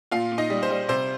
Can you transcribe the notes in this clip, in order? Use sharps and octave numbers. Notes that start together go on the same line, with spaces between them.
A#2 F4 F5
A#2
D#4 D#5
G3
C5
G3
C3 C5